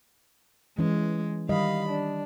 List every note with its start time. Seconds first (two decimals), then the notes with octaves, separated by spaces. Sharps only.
0.79 E3 G#3 C#4
1.49 D#3 G3 D#5 F5 B5
1.90 D4